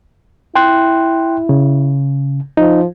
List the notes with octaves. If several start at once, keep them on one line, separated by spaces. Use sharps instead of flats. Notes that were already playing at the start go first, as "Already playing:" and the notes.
E4 G5 C6 F#6
C#3
F3 D#4